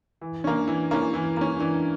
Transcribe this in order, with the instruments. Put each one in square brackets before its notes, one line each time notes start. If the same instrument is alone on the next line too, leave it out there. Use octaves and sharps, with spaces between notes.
[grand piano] E3
[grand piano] C#4 [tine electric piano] D4
[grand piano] A#3
[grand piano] E3 [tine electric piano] E4
[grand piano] A#3 C#4
E3
A#3 C#4
[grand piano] E3 [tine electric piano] D4